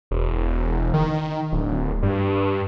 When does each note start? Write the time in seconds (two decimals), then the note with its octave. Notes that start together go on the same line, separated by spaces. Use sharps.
0.11 E1
0.94 D#3
1.52 D1
2.03 G2